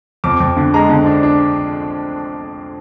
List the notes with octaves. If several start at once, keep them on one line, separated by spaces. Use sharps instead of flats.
F2 D6
F2
D3
G#3 A#5
D3
D4
D4